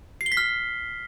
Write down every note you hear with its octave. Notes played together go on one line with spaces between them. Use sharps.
C7
G7
B6
F6